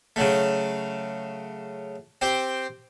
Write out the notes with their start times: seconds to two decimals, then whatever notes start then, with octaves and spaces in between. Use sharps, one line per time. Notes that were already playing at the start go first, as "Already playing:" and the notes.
0.16 C#3 F#3 A3
2.21 C4 G4 C5